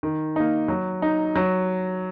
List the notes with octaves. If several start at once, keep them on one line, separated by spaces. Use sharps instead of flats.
D#3
A#3 D#4
F#3
D#4
F#3